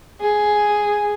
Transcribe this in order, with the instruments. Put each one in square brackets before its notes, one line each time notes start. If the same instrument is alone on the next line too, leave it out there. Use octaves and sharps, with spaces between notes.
[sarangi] G#4